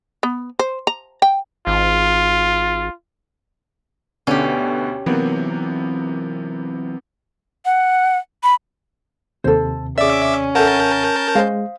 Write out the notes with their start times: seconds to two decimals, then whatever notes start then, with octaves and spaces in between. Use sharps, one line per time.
0.23 B3
0.59 C5
0.87 A#5
1.22 G5
1.67 G#1 F4
4.27 D2 B2 D3 C#4 G4
5.06 C3 E3 F#3 A#3 B3
7.65 F#5
8.43 B5
9.44 D#2 C3 A4 C5
9.98 C#4 G#4 D5 E5 D6
10.55 A4 A#4 E5 F#5 A5 G6
11.35 G#3 C5 D#5 F5